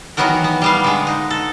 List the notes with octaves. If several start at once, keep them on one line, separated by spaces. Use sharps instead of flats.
D#3 E3 F#3 B3 F#4 A#4
B3
G3 B3 F5
D3 G#3
D#4
A4